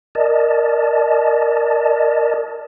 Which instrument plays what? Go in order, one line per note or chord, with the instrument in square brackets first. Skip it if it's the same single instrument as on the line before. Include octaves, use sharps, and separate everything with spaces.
[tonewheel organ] A#4 D5 D#5 A5